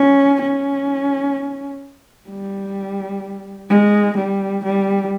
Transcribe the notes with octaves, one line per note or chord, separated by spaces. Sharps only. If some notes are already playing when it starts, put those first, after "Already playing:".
Already playing: C#4
C#4
G3
G#3
G3
G3